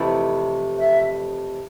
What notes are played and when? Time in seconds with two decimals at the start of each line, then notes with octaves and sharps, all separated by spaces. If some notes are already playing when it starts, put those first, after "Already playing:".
Already playing: F2 C3 E3 A3 E4
0.79 E5